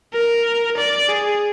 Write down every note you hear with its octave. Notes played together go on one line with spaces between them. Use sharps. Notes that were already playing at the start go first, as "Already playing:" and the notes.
A#4
D5
G#4